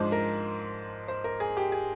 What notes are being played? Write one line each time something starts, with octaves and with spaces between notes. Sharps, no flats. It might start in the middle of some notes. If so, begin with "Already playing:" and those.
Already playing: G#2 F3 G#3 D4 C5
A#4
C5
A#4
G#4
G4
G#4